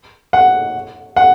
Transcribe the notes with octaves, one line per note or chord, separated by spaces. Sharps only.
F#5
F#5